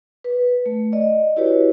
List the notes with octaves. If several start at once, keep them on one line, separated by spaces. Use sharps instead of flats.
B4
A3
D5 D#5
E4 F#4 G4 B4 C#5